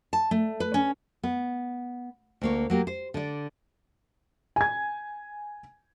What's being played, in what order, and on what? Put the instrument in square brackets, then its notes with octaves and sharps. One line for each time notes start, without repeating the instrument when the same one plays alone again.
[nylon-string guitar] A5
A3
B4
C#4
B3
D2 A#3 C#5
F#3 A#3 G4
C5
D3 D5
[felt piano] G#5 G#6